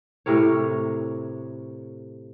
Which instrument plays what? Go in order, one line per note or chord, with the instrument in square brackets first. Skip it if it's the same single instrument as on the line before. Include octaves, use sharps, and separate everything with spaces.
[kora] A2 C3 A#4 C#5